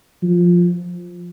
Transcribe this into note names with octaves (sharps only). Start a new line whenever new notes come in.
F3